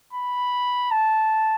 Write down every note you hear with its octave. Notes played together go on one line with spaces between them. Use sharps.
B5
A5